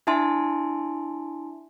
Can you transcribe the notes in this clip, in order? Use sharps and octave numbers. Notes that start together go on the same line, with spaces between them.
D4 E4 E5 G#5 A5 C6